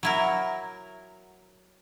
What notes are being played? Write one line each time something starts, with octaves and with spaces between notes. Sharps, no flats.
F#3 E4 A#4